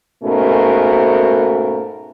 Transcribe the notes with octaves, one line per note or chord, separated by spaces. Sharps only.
G#2 B2 A3 A#3 C#4 A#4